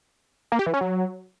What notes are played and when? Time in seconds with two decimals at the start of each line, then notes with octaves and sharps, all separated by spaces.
0.52 A#3
0.59 G4
0.66 E3
0.74 C#4
0.81 F#3